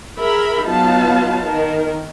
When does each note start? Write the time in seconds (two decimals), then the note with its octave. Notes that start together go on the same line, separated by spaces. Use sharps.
0.21 G#4 A#4 E5 B5
0.67 F#3 B3 D#4 F4 F5 A5
1.48 D#3 A#4